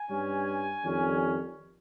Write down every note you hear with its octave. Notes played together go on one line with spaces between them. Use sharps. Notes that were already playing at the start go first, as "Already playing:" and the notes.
Already playing: G#5
G2 G3 C#4
F2 D#3 G3 C#4